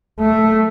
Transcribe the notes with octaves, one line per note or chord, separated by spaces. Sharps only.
A3